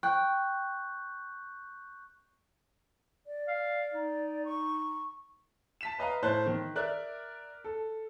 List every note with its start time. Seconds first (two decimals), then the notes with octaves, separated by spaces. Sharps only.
0.03 G5 C#6 F#6 G6
3.26 D5
3.48 F5
3.94 D#4
4.45 C#6
5.81 A5 B6 E7
5.98 B4 D#5 F5 A#5
6.22 A2 C5 A5 F#6
6.46 D#3
6.76 A#4 D5 E5 F#6
7.64 A4